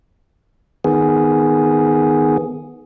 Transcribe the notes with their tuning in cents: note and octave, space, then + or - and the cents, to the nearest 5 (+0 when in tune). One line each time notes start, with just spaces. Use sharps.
D#3 +0 B3 +0 G#4 +0